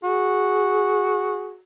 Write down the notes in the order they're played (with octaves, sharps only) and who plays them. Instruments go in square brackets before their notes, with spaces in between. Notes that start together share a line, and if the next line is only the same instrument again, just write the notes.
[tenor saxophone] F#4 [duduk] G#4